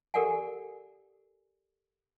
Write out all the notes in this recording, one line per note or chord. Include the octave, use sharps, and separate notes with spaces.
G4 A4 A#4 D5 F#5 G#5